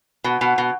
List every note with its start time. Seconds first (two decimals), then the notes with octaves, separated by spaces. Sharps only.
0.24 B2
0.41 B2
0.58 B2